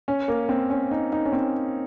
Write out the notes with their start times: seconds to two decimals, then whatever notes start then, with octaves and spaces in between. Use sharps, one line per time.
0.08 C#4
0.28 A#3
0.49 C4
0.70 C#4
0.91 D#4
1.13 D#4
1.26 C#4
1.32 C4